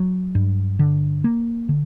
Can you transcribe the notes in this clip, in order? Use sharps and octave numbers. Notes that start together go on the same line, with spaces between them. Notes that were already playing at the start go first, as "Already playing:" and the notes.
Already playing: F#3
G2
D3
A#3
D3